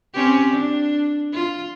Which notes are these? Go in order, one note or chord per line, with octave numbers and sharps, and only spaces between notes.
C4 C#4 G4
D4
F4